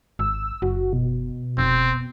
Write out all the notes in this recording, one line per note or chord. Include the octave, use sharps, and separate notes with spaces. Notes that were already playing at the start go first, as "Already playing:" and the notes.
G#1 E6
F#1 F#4
B2
F1 C4